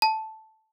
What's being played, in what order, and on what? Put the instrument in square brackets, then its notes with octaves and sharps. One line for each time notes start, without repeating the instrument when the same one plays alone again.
[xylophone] A5